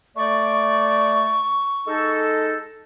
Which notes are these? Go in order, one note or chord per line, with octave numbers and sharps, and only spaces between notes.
A3 D5 C#6
G#3 D#4 A4